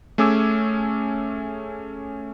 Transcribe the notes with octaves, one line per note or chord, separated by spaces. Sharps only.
A3 C#4 G#4 D6 E6 G#6